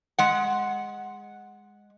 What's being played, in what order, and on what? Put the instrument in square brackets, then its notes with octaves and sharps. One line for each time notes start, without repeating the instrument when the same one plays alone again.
[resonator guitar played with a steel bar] G#3 F#5